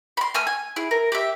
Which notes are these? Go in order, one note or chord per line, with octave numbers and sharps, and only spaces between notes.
B5 C6
A3 G#5 E6 F6
G#5
E4 G#4
A#4
G4 E5